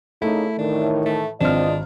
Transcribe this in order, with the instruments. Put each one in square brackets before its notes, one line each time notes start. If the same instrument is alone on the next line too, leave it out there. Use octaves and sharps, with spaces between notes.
[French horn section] C#3 A#3 D#4 [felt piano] A3 [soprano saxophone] E4
[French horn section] A2 E3 [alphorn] D#3 [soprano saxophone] D4
[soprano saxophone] A3
[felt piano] G#1 F6 [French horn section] E2 F4 D#5 [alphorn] C4 [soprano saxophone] D4